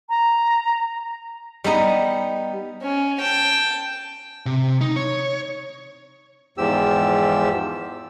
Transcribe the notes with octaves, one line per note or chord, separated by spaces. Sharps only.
A#5
G3 B3 D#4 D#5
C#4
G5 A5
C3
D#4
C#5
E2 G#2 F3 G4 E6